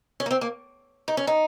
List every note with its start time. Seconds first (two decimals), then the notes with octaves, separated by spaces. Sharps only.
0.20 C#4
0.26 A#3
0.31 C4
0.41 A#3
1.08 D#4
1.17 C#4
1.27 D#4